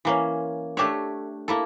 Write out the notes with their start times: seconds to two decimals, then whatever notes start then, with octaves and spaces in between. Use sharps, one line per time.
0.05 E3 A#3 C#4
0.77 A3 D4 G4 C#5 E5
1.48 A#3 E4 A4